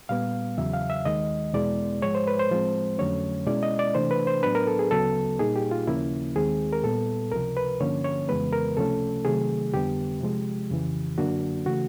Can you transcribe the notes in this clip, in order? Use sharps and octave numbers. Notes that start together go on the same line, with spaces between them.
A#2 G3 B3 F5
E2 C#3 F#3 E5
F5
E5
D#2 D#3 G#3 D#5
E2 B2 G#3 B3 E4 D5
G#2 F3 G#3 C#5
C5
B4
C5
A2 F3 G#3 C4
F2 D3 F#3 A3 C#4 C#5
B2 G#3 C#4 E4 D5
D#5
D5
C3 E3 A3 D4 C5
B4
C5
A2 F#3 B3 D4 B4
A#4
A4
G#4
D2 C#3 F#3 B3 A4
A#2 G3 A#3 D#4 G#4
G4
F4
D#2 C#3 F3 A#3 C#4 E4
D#2 D#3 G#3 C4 G#4
A#4
A#2 G3 B3 A4
C#2 C3 F3 A#4
B4
G2 D3 F3 A#3 C#4 C#5
C#5
F2 C#3 E3 G#3 B3 B4
A#4
C#2 C3 F3 A3 C#4 A4
C3 D#3 F#3 A3 G#4
F2 D3 G3 B3 G4
C3 F3 G#3
F2 C#3 E3
F#2 D3 F#3 A#3 D4 F#4
C#3 E3 A3 F#4